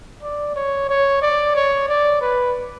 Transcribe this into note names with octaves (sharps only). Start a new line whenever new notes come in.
D5
C#5
C#5
D5
C#5
D5
B4